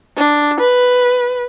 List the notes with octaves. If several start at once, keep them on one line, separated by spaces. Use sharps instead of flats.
D4
B4